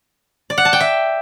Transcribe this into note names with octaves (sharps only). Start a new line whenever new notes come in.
D5
F#5
A5
G5
E5